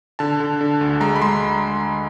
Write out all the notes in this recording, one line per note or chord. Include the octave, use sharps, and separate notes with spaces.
D3 A5
D3
D3
D2
G#3 A#5
B5
G#3 C6